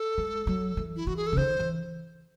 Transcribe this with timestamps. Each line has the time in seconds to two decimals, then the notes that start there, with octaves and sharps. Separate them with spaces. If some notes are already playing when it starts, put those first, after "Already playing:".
Already playing: A4
0.18 G#3
0.47 F#3
0.77 E3
0.96 E4
1.07 E3 F#4
1.17 G#4
1.27 A4
1.32 C#3
1.37 D#3 C5
1.59 E3